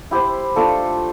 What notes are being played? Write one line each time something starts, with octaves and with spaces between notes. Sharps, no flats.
E4 G4 C5
A3 D4 F4 A4